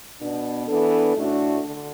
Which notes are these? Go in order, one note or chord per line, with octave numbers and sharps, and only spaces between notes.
B2 B3 D4
E3 B3 D4 A4
A2 A3 D4 F#4
D3